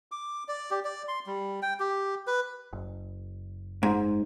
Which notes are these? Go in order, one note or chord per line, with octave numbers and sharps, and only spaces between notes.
D6
D5
G4
D5
C6
G3
G5
G4
B4
F#1
G#2